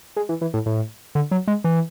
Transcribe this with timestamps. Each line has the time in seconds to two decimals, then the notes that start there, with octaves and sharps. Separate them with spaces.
0.16 G#3
0.29 E3
0.41 E3
0.54 A2
0.66 A2
1.15 D3
1.31 F#3
1.48 G#3
1.64 E3